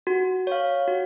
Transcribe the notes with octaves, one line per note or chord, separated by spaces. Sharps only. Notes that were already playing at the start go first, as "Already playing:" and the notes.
F#4
C#5 F5
F#4